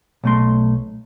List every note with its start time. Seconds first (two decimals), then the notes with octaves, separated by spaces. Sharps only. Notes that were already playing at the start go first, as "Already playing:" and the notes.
0.24 B1 A3 C6